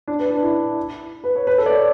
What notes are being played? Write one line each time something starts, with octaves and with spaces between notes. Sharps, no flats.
D4
B4
D4
E4
B4
C#5
B4
A4
D5
C#5